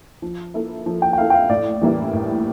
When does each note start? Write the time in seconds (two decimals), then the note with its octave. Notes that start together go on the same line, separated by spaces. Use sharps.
0.22 F3
0.54 A#3 E4 A4
0.86 F3
1.02 G5
1.13 G5
1.18 A#3 E4 A4 F5
1.30 G5
1.34 F5
1.49 A2 D5
1.81 E3 G3 A#3 E4
2.13 A2